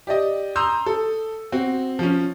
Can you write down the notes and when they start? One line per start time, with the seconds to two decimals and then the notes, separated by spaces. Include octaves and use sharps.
0.07 G4 D5 D#5
0.56 A#5 C6 D#6 E6 G6
0.86 A4
1.52 C4 F#4
1.99 F3 C#4